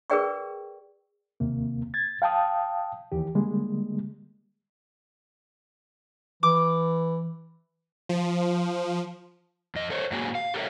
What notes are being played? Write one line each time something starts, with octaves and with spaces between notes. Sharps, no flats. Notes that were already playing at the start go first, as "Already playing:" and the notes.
G#4 A#4 B4 D5 G5 C#6
D#2 C3 A#3
G#6 A6
F5 G5 A5 D#6
D#2 E3 G4
D3 G3 G#3 A#3
E3 D6
F3
F2 D#5
A4 C5 C#5
G#2 F#3 A#3 F#4 G#4
F5
G4 A4 A#4 C#5 E5